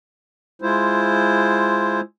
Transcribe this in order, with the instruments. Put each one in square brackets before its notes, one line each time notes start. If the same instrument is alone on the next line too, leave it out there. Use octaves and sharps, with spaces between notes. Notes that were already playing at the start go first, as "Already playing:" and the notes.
[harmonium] G#3 E4 F4 C5